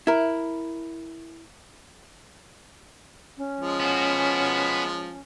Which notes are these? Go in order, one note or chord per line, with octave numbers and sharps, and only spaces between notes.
E4 A#4
C#4
F3 G#3
B3 F#4